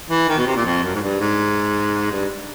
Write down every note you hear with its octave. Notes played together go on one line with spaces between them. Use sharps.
E3
D#3
B2
C3
A#2
F2
F#2
G#2
G2
G#2
G2